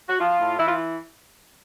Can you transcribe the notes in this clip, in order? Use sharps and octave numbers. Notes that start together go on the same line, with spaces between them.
F#4
F3 F4
A2
E3 E4
F4